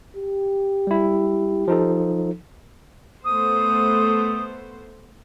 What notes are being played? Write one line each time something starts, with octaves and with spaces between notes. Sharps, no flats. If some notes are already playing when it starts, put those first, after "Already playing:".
G4
G3 E4
F3 D#4 A4
A3 B3 C5 D#6